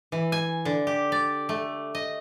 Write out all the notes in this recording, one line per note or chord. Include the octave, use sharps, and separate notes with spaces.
E3
G#5
D3
G4
D5
A3
D#5